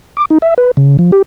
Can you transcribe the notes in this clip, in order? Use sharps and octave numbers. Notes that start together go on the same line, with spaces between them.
D6
D#4
E5
B4
C#3
F3
G4